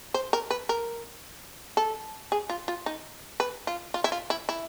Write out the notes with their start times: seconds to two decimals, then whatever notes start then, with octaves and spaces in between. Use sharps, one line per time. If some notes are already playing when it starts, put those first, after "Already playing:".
0.14 C5
0.33 A#4
0.50 B4
0.69 A#4
1.77 A4
2.32 G#4
2.49 F4
2.68 F4
2.86 D#4
3.40 B4
3.67 F4
3.94 F4
4.04 E4
4.12 F4
4.30 E4
4.49 E4